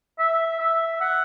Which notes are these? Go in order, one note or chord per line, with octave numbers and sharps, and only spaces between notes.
E5
E5
F#5